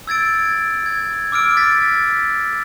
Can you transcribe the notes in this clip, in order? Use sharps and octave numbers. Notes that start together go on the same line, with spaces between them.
E6 G#6 A6 D7
G#6
D6 E6 F6 D7
A6 B6